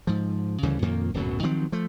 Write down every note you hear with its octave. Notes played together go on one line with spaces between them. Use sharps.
G#2 F3
D2 C#3 E3 G3
F2 A#2 D#3 A#3
D1 F#2 B2 F#3
D#3 F3 F#3 C4
F3 A3